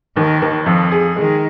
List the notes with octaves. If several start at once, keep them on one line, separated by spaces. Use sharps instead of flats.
D#2 D#3
D#2
F2 F3
G#4
D#3 G#3